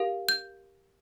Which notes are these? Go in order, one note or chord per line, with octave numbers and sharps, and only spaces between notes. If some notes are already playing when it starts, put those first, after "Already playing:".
Already playing: G4 A#4 F5
G6